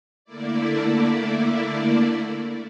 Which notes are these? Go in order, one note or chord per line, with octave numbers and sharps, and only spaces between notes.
D3 A3 A#3 E4 D5